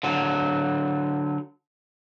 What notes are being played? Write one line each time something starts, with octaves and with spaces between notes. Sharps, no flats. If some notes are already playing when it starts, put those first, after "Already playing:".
D3 F#3